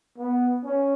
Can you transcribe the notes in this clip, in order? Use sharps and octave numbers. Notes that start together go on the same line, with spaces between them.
B3
C#4